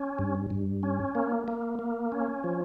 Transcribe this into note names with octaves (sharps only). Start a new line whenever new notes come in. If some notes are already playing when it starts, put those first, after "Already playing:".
Already playing: C#4
G2
G2
C#4
A#3
A#3
A#3
C#4
F3